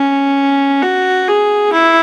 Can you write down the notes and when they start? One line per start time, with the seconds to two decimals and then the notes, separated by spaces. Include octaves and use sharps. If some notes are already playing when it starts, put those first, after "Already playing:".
Already playing: C#4
0.82 F#4
1.28 G#4
1.73 E4